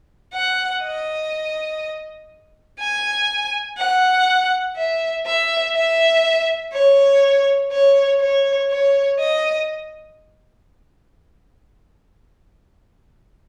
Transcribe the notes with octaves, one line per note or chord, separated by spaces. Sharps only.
F#5
D#5
G#5
F#5
E5
E5
E5
C#5
C#5
C#5
C#5
D#5